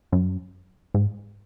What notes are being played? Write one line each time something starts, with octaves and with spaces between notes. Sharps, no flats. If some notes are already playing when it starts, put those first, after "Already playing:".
F#2
G#2